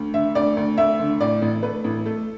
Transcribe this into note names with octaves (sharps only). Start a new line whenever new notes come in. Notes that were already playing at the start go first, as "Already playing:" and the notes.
Already playing: D2
D3 E5
D2 D5
D2
D2 E5
D3
A2 D5
A1
A3 B4
A1
A3 A4